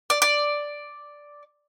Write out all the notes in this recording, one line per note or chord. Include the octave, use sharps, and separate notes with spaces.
D5
D5